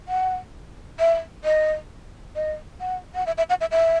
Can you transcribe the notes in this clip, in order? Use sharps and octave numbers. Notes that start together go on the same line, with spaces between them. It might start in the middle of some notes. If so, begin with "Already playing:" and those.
F#5
E5
D#5
D#5
F#5
F#5
E5
E5
F#5
E5
E5